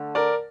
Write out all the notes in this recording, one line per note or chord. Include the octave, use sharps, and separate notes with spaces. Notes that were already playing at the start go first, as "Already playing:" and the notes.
Already playing: D3 A3
A#4 D5